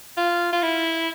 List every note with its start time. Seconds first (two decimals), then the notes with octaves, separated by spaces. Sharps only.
0.17 F4
0.53 F4
0.62 E4